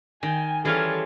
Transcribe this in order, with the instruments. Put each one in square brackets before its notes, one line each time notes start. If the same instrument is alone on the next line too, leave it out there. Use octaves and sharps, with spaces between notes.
[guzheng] D#3 G5 [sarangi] G#5
[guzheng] E3 G3 [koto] C#4 F4 G#4 [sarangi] A4